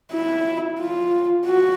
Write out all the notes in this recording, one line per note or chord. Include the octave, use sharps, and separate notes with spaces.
E4
F4
F#4